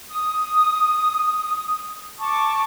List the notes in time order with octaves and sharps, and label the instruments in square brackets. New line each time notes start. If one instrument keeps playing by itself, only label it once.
[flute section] D#6
A5 C#6 D6